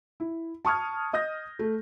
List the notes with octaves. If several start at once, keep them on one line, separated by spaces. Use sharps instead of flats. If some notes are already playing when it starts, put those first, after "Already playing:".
E4
A5 C#6 D#6 F6 G#6
D#5 D#6 G6 A#6
A3